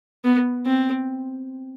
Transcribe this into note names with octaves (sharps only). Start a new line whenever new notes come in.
B3
C4